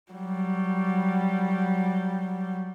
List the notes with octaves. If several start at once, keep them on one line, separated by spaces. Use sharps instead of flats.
F#3 G3